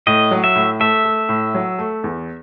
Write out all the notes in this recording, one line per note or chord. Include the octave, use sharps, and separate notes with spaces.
A2 D#5
F#3
E5
A2
A3 E5
A3
A2
F#3
A3
E2